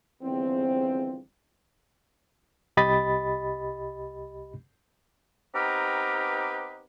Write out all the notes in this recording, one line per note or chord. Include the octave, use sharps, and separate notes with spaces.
G1 E2 C#3 F3 C4
C2 G4 D#5 B5 A6
B3 C4 D#4 G4 A#4 B4